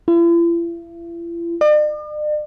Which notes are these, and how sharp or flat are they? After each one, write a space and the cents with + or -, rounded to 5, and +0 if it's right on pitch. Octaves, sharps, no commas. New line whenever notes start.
E4 +45
D5 +45